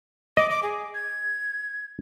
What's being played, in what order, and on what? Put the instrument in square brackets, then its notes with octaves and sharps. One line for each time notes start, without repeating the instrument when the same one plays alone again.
[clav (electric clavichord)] D#5 [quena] D6
[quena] D6
G#4
G#6